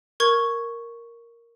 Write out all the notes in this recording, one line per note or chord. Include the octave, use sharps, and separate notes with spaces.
A#4 C#6 G#6